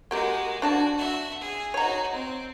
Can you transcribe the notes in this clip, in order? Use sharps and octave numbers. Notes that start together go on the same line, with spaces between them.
G#3 A#3 F#4 G4 A#4
D4 F#4 D5 A5
F#4 E5
G#4
D#4 F#4 C#5 A#5
C4